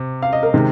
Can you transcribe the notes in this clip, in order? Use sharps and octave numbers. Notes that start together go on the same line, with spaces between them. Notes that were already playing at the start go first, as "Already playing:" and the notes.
Already playing: C3
F5
D#5
A#4
C3 D#3 G#3